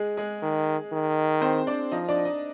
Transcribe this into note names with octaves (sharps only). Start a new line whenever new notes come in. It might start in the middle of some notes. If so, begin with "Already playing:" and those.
Already playing: G#3 G#4
G#3 G#4
D#3
D#3
C4 C5
D4 D5
F3 D#4 D#5
D4 D5
D#4 D#5